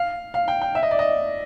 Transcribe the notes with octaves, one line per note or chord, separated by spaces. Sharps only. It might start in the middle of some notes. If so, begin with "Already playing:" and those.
Already playing: F5
F5
G5
G5
E5
D#5
D5
D#5